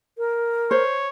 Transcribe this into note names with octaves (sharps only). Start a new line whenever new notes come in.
A#4
C5 C#5